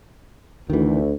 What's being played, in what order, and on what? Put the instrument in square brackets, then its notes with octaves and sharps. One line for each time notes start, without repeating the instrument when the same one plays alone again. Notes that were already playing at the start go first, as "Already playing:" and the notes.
[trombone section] D2 [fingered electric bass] D#3 E3